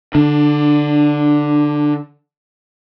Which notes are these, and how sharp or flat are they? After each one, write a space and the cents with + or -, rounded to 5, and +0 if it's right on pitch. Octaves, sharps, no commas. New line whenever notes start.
D3 +0 D4 +20